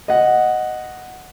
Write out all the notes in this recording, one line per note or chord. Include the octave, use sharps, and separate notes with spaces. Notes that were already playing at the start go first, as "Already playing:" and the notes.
D#5 F#5